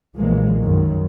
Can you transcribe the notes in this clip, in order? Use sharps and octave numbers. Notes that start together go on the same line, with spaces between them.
B1 A#2 E3 F3 G#3 A#3
F#2 D#3